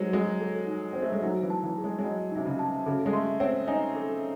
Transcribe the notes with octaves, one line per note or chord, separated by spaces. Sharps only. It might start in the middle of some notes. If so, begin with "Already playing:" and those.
Already playing: F#3 G#3 D#4 C5
G#3 F#4
A4
D#4
C4 C5
A3
G#3
F#3 D#4
E3
A5
E3
G#4
G#3
G#3
F#3 D#5
C3 D#4
C#3
A5
C#3 A4
G#3
A3 C6
C4 C#5
D#4 G#5
A4